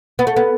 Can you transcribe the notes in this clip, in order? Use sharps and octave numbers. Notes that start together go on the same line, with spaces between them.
B3
A3
B3